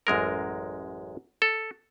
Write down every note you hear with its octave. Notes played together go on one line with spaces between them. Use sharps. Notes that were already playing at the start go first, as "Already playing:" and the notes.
A1 F#2 G#3 A#4
A4